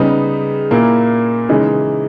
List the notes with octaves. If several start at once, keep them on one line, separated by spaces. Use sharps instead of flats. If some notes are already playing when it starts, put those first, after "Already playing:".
Already playing: C#3 G3 B3 D#4
A#2 A#3 E4
C#3 E3 G#3 D#4